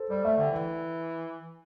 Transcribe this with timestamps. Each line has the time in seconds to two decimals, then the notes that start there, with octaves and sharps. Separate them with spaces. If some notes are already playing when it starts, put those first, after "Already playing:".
Already playing: A4 C5
0.10 G3 D5
0.24 A3 E5
0.38 D3 G5
0.51 E3